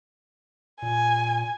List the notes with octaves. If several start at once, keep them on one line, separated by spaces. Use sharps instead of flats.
A#2 G#5